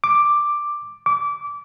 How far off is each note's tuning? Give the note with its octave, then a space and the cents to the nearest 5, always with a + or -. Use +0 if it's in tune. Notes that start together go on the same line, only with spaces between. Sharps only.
D6 +5
D6 -25